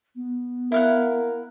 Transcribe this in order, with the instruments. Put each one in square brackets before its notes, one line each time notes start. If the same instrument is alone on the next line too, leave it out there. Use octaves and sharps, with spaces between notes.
[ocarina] B3
[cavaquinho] E4 F5 F#5 [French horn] A#4